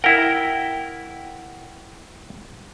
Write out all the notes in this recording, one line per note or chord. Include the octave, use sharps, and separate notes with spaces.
E4 A#4 F#5 G5